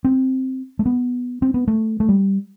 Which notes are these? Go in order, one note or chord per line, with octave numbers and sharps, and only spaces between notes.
C4
A3
B3
C4
B3
A3
A3
G3